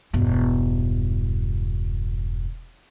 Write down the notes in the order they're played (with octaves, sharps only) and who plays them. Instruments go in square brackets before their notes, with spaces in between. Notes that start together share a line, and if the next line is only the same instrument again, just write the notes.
[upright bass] E1 G2